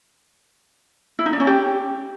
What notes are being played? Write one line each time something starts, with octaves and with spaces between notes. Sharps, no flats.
E4
D#4
D4
C#4
G4